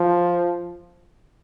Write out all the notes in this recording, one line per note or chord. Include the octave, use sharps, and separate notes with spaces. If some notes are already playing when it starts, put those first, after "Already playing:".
Already playing: F3